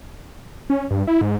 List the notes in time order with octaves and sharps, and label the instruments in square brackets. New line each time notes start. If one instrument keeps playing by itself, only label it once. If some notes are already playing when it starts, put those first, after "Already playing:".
[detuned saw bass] C#4
G2
E4
G#2